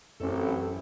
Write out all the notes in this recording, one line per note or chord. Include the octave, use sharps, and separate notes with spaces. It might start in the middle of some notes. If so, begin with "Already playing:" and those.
A1 F#2 C4 A4